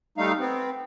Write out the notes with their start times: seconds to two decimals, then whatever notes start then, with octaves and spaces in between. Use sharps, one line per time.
0.18 G3 A3 D#4 F5
0.39 B3 C4